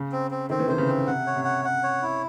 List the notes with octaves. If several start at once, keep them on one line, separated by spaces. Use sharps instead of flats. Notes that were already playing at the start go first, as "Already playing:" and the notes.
Already playing: C#3
C4
C4
D#3 C4
E3
C3 D#3 C5
C#3 E3
C4
C3 F#5
C#5
C3
F#5
F#5
C#5
E4